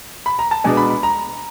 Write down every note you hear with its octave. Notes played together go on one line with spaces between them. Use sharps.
B5
A#5
A5
B2 G#3 B3 D4 G#5
B5
B5
A#5